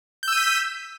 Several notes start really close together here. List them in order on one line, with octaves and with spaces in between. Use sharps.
G6 E6 D#7 B6